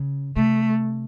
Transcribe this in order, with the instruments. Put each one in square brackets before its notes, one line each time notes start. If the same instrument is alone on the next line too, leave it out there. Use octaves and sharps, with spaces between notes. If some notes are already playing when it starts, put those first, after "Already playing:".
Already playing: [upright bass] C#3
[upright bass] C3 [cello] A3